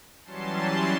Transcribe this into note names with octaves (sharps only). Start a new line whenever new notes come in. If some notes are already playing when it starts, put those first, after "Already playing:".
E3 F#3 G3 C#4 A5 C6